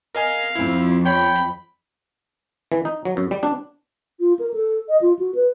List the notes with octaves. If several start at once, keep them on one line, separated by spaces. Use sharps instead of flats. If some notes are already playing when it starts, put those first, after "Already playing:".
A#4 D#5 F5 G#5
F2 C4 E4
C#5 G5 B5
E3
D#4
F#3
F#2
G3
D4
F4
A#4
A4
D#5
F4
F#4
B4